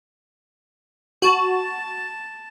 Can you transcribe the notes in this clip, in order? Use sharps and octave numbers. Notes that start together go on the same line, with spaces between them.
F#4 A5